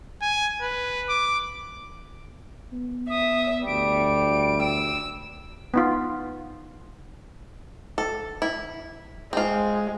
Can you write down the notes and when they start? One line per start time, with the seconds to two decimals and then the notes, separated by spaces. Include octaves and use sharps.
0.22 G#5
0.62 B4
1.09 D6
2.73 B3
3.10 E5 D#6
3.67 D2 G3 D7
4.63 E6
5.74 B3 D#4 F4
7.98 A4
8.42 E4
9.33 G#3 C4 F4